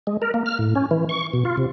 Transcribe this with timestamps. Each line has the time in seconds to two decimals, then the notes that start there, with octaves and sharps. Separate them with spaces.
0.07 G#3
0.22 A#4
0.34 A#3
0.46 F6
0.59 A2
0.75 C#4
0.91 E3
1.09 C#6
1.33 B2
1.45 F4
1.57 C3